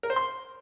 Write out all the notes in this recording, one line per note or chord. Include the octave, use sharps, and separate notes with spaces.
A#4
C5
C6